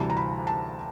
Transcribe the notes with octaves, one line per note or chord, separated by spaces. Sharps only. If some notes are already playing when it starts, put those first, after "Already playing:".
Already playing: D2 C3 E3 G3 A5
A#5
B5
A5